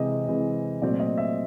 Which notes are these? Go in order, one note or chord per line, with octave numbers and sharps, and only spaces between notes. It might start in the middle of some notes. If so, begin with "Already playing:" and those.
Already playing: C3 E3 G#3 C4 D#5
C3 E3 G#3 C4
A#2 F#3 A3 C4 D5
D#5
E5